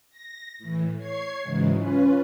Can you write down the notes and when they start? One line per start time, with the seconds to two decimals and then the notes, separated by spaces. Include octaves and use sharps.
0.10 A#6
0.59 A2 E3
0.98 C#5 G#6 C7
1.43 G#2 C#3 E3 F#3 G#3
1.76 C#4 F4 B4